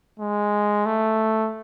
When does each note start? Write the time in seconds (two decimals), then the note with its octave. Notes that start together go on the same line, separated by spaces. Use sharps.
0.20 G#3
0.86 A3